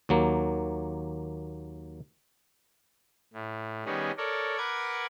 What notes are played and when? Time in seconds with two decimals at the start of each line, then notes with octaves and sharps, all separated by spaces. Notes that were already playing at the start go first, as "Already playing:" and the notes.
0.09 D#2 F#3 A#3
3.34 A2
3.86 D#3 G3 B3 C#4 D#4 G#4
4.17 A4 A#4 C#5 D5
4.58 A#4 B4 F#5 D6 G#6